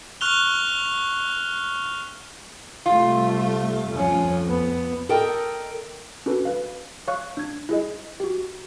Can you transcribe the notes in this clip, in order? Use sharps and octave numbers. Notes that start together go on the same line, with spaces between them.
C#6 F6 F#6 F7 G7
C3 G3 A3 F4
F2 F3 C#4
B3
A4 A#4 D5 D#5 G5
C#4 D4 F#4 A4 B4
B4 F5
C#5 F5 C#6 F#6
D4 G#6
E4 G#4 D#5
F#4 G4